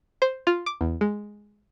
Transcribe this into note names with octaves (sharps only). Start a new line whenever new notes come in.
C5
F4
D6
E2
G#3